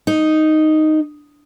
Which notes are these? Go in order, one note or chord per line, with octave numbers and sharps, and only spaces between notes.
D#4